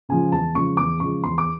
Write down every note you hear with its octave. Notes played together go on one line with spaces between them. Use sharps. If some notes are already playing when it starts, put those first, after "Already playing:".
C#3 F3 G#3 G#5
E2 A5
C#3 F3 G#3 C#6
E2 D6
C#3 F3 G#3 C#6
E2 C6
D6